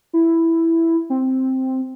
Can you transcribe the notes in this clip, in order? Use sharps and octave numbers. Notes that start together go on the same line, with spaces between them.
E4
C4